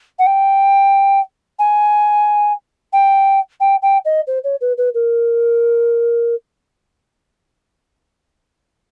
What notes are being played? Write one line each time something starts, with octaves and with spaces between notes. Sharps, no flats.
F#5
G5
G#5
G5
G5
G5
D#5
C5
C#5
B4
B4
A#4